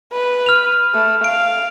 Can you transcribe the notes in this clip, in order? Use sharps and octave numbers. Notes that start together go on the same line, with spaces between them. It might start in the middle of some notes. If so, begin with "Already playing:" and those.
B4
F6 F7
A3
F5 D7